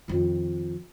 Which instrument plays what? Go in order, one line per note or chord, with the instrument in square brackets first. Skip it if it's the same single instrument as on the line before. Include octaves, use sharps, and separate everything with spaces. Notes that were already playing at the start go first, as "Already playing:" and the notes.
[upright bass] F2 D#3